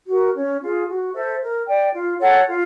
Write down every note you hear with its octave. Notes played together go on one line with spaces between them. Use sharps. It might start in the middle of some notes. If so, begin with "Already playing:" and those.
F#4 A#4
C#4
F4 G#4
F#4
A4 C5 E5
A#4
D5 G5
F4
A4 C#5 F#5
F4